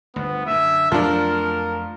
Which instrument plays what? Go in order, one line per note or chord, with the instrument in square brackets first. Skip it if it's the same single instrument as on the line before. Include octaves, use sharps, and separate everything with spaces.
[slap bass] G1 D2 [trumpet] B3
[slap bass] F#2 D3 [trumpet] E5
[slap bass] F2 F#3 A3 [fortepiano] F3 D4 [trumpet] A#4